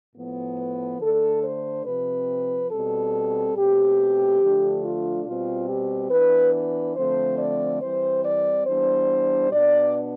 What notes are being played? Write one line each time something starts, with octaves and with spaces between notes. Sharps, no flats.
A2 F3 B3
B4
D3 A3 D4 A4
C5
C3 F3 C4 B4
B2 G3 C4 A4
B2 A3 C4 G4
D3 F3 A3 D4
F4
B2 G3 C4 F4
G4
E3 B3 D4 B4
B4
D3 F3 A3 C4 C5
D5
E3 G3 C4 C5
D5
E3 G3 B3 D4 C5
B2 B3 D4 D5